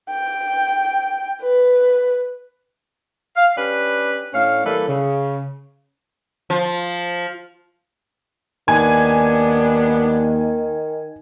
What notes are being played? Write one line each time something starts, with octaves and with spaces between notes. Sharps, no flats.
G5
B4
F5
C#4 D4 G4 B4
A2 C#4 D4 F5
E3 G3 A#3 A4 B4
C#3
F3
D#2 D#3 B3 D4 G#5